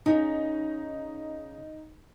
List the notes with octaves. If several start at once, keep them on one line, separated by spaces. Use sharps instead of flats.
C#3 D#4